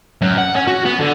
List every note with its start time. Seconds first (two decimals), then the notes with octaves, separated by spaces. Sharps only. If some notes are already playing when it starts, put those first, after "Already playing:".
0.22 F#2
0.38 F#5
0.55 C#4
0.67 F#4
0.85 B3
0.99 D3